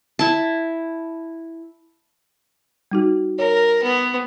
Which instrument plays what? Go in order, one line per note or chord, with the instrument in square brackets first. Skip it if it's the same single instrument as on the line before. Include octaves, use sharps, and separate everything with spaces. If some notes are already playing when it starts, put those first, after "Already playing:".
[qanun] E4 A5
[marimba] G3 D#4 F#4
[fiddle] A#4 [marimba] C#5
[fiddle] B3